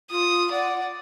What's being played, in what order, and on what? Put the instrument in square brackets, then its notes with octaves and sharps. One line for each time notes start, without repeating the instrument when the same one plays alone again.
[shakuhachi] F4 [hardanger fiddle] D#6
[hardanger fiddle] D5 [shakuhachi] F#5